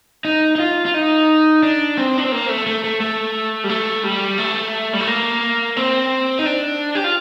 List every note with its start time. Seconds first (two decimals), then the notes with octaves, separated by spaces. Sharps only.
0.25 D#4
0.55 D#4
0.60 F4
0.85 F4
0.94 D#4
1.63 D4
1.98 C4
2.18 D4
2.24 C4
2.32 A#3
2.49 A3
2.67 A3
2.84 A3
3.00 A3
3.64 G3
3.69 A3
4.04 G3
4.38 A3
4.93 G3
5.00 A3
5.07 A#3
5.77 C4
6.39 D#4
6.46 D4
6.95 G4
7.04 F4